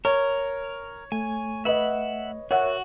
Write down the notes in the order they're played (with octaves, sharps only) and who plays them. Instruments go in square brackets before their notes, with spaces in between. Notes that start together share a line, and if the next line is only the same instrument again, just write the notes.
[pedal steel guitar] A#4 [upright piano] C#5
[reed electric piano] A3 [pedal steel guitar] G#5
[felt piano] B4 D#5 [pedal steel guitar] E5 F#5 B5
[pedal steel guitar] F#4 [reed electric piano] A#4 C#5 E5 [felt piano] F#5